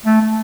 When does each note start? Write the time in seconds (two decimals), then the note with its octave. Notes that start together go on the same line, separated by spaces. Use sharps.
0.06 A3
0.21 A3